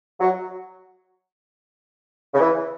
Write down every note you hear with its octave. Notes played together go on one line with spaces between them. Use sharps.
F#3
C#3
E3